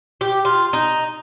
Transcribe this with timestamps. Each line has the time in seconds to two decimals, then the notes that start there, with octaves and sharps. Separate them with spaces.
0.21 G4
0.45 F4
0.73 D#4